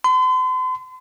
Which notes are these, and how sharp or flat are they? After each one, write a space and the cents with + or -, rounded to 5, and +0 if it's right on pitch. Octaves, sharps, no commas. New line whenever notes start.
C6 -45